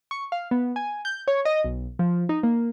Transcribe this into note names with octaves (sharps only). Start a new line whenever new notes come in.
C#6
F5
B3
G#5
G6
C#5
D#5
B1
F3
D#4
A#3